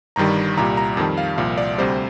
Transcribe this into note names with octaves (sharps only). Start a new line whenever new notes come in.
G1 G2 D#3 G3 A#5
C2 A#2 G3 A#5
A#5
F2 D#3 G3 A5
F5
C2 A#2 F3 F5
D5
D2 C3 G3 C5